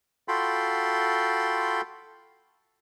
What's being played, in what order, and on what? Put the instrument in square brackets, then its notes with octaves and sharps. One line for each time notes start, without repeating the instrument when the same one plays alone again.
[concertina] F4 F#4 A4 G5 B5 C6